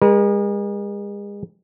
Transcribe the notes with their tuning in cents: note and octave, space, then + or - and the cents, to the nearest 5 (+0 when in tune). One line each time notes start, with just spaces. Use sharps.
G#3 -35 A#4 +45